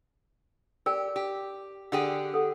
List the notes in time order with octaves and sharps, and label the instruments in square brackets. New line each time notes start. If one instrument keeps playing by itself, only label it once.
[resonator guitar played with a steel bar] G4 [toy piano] A#4 D5 G5
[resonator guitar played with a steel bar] G4
[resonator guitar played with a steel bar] D3 G4 G#4 [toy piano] F#5
[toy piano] A4 F#5